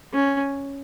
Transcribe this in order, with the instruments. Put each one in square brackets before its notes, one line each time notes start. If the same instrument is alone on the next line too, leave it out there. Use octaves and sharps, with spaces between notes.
[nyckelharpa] C#4